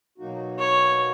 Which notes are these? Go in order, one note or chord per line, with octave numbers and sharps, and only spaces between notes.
B2 F#3 A#3 D#4 F#4
C#5